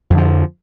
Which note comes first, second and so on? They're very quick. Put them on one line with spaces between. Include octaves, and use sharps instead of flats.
F2 D3 F3